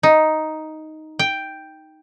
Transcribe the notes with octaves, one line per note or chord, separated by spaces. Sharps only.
D#4
G5